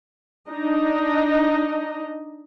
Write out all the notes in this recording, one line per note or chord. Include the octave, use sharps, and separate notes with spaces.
D4 D#4 D#5